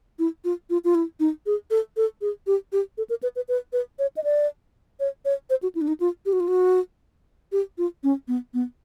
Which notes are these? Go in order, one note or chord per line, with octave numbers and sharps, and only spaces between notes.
E4
F4
F4
F4
E4
D#4
G#4
A4
A4
G#4
G4
G4
A4
A#4
B4
B4
B4
B4
C#5
D#5
D5
C#5
C#5
C5
F#4
E4
D4
D#4
F4
G4
F#4
F4
F#4
G4
F4
C#4
B3
B3